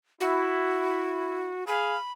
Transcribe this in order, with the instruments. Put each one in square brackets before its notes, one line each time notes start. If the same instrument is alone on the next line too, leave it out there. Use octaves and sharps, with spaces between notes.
[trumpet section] E4 [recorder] F#4
[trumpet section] G#4 F5 [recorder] B5